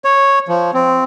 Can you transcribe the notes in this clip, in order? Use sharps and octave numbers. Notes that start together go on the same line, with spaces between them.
C#5
F3
C4